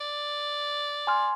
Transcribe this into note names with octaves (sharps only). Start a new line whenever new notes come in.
D5
G#5 C6 F6